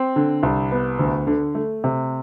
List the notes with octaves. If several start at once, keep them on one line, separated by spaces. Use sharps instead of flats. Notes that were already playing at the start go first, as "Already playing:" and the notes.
Already playing: C4
D3
C2
B3
D2
D3
A3
C3